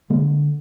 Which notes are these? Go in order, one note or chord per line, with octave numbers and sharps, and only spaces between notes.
D3 G#3 A#3